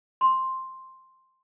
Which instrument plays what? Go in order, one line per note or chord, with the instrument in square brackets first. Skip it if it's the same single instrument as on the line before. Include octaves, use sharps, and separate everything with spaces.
[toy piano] C6